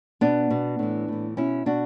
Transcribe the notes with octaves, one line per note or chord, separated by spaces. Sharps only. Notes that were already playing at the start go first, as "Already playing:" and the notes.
B2 B3 D4
B2
A2 E3
A2 E3
B2 C#4 E4
B2 D4 F#4